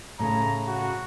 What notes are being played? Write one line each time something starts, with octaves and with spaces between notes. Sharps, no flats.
A2 C#3 A#5
F#4